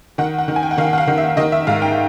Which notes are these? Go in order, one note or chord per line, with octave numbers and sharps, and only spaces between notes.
D#3 F#5
F#5
D#3
G#5
G5
F#5
D#3 F5
F#5
F5
D#3
E5
D#3 D#5
E5
G#2 F5
G5